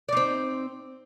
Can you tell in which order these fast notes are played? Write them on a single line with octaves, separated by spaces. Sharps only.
D5 D#4 C4